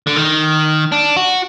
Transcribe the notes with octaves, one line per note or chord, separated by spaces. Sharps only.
D3
D#3
D4
F#4